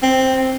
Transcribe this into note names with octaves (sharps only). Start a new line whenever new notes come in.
C4